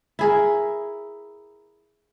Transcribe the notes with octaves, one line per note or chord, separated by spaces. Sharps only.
E4 G#4 A#4